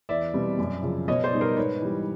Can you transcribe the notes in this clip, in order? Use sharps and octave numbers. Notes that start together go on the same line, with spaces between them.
E2 D5 E5
B2 G3 C4
F#2
C#3 F3
B2 C#5 D#5
C5 D5
G3 B3 D#4
A#4 C5
G#2 B4 C#5
E3 G3